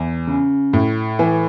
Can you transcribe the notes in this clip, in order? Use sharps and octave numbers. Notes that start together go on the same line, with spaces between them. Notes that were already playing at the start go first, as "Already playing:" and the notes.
Already playing: E2
C#3
A2
E3